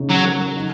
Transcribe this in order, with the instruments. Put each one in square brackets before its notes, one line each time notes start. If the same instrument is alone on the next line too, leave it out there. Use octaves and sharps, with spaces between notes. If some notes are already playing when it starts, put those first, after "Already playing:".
Already playing: [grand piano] C#3 D#4
[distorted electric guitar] F#3
[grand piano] A#4
D#4